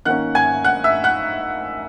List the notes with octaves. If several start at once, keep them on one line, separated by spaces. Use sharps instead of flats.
D#3 A#3 C#4 F#5 F#6
G#5 G#6
F#5 F#6
E5 E6
F#5 F#6